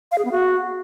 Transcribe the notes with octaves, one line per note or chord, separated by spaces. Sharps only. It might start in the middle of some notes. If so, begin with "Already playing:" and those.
F5
G#4
B3
F#4